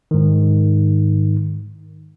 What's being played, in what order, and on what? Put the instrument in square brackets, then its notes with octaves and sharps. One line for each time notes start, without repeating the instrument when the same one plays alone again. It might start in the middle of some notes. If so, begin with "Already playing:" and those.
[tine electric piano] G#2 D#3